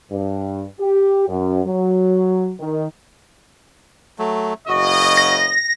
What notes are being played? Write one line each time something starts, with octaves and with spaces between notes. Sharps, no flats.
G2
G4
F#2
F#3
D#3
F#3 A3
F#1 C#3 F#4 D#5
A#6